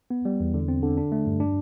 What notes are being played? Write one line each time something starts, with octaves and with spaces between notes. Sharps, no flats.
B3
G3
E2
D3
C4
D3
D4
A3
G2
D4